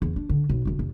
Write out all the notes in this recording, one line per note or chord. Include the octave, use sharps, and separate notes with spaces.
E2
D4
D3
B1
E1 D2
F1